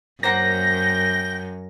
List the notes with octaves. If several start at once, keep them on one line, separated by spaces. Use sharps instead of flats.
F#2 A#3 C5 F#5 G5 A#6